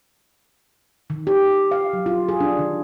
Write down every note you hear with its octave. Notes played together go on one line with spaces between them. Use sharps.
D#3
G4
F5
F#3
F4
G#4
D4
D#3